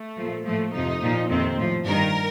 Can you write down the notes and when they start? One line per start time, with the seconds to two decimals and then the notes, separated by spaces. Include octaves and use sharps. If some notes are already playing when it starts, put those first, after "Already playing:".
Already playing: A3
0.16 A#2 F3
0.45 A2 F3 A3
0.73 F2 C3 F3 D#4
1.02 A#2 F3
1.29 F2 C3 D#3 C4
1.58 A2 F3
1.86 G2 D#3 A#4